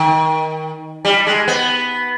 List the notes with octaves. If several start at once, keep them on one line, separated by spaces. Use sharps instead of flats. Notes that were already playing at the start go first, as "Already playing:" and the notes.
Already playing: D#3
G3
G#3
B3